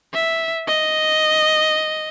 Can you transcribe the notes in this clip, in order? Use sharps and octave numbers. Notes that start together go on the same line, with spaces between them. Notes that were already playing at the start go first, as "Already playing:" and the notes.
E5
D#5